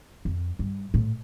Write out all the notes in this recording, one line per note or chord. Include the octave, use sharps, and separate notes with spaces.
F2
G2
A2